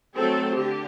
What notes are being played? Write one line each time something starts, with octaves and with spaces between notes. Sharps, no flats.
F#3 A3 C4 A4
D3 G4